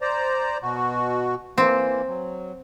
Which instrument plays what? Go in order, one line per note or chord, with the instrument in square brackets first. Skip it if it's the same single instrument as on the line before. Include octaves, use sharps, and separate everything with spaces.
[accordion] C5 D5 A#5
B2 F#4
[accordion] E3 A#3 [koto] C4
[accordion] F#3